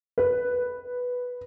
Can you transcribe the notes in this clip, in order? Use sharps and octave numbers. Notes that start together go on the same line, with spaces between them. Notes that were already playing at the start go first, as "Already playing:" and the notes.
B4